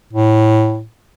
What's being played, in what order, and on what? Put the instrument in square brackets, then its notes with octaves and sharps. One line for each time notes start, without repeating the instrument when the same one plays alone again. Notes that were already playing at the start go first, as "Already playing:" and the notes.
[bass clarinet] A2